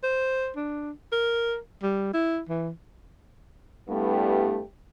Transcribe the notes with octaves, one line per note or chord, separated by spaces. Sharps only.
C5
D4
A#4
G3
E4
E3
G2 G3 A3 B3 E4 G4